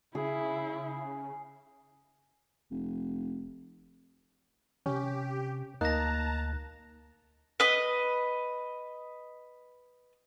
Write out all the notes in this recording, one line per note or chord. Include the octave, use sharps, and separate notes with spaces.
C#3 E4 G#4
F1
C3 C#4 G4
D2 A#3 D#4 A5 A#5 F#6 A#6
B4 D#5